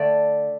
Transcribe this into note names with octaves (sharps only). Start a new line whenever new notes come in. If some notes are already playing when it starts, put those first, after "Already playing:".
Already playing: D3 A3 D5